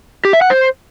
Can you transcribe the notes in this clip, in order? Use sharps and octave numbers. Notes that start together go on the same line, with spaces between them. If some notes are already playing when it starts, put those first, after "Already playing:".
G4
E5
F#5
C5